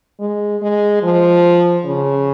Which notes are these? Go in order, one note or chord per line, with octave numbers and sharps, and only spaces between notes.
G#3
G#3
F3
C#3